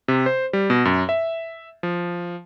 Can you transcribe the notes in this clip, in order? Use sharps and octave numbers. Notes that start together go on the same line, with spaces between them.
C3
C5
G3
B2
F#2
E5
F3